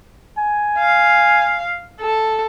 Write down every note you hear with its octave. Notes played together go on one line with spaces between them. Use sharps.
G#5
F5
A4